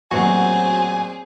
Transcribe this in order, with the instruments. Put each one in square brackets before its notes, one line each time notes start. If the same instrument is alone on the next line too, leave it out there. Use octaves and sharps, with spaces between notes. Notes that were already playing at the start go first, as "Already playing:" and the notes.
[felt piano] A1 A#2 F#3 [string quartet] C4 G#4 [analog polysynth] F#4 [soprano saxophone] G#5